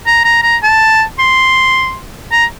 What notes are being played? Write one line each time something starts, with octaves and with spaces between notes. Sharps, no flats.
A#5
A#5
A#5
A5
C6
A#5